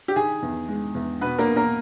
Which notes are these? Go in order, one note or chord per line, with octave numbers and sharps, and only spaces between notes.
G4
D#3 G#4
E2
G#3
E2
B2 B3 B4
A#3 A#4
E2
A#3 A#4